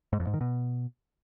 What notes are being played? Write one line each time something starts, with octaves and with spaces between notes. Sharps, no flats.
G#2
F2
G#2
D#3
B2